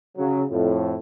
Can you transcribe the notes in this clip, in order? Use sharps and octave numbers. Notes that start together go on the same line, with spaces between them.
C#3 F#3
F2 A2